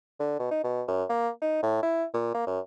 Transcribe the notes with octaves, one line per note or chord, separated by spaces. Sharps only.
D3
B2
D#4
B2
F#2
A#3
D#4
A2
E4
A#2
A#3
F#2